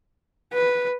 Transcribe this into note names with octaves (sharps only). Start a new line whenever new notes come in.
B4